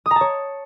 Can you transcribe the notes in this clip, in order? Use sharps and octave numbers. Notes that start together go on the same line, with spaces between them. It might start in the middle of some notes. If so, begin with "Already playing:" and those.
D#6
A#5
A5
C#5